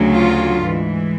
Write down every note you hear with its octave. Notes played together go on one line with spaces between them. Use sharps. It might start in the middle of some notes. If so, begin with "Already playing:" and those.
Already playing: D2 C#3 F#3
F4
G#2 E3